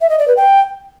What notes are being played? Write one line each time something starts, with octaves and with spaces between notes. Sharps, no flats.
E5
D#5
D5
B4
G5